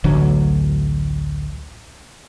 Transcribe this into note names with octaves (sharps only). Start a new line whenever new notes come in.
A1 D2 F#3